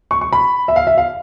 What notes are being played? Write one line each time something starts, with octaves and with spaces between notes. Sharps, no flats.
C#6
C#6
B5
E5
F5
E5
F5